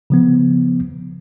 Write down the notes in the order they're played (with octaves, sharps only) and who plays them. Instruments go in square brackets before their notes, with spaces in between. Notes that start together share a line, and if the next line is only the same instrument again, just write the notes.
[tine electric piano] C#3 F3 B3